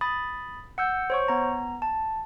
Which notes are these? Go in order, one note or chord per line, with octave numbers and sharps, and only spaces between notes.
B5 D#6 A6
F#5 E6 G6
C5 C#5 C#6
B3 A#5
A5